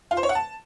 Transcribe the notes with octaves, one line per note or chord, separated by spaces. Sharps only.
F4
C5
C#5
F#5
A5